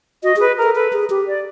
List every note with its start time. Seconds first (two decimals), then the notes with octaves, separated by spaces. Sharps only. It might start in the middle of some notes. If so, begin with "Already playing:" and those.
0.23 F#4 D#5
0.36 G#4 B4
0.58 A4 A#4
0.75 A4 B4
0.93 G#4
1.10 G4
1.27 D5